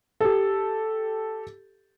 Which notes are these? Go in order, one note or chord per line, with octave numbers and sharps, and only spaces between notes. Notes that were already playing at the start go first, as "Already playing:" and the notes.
G4 A4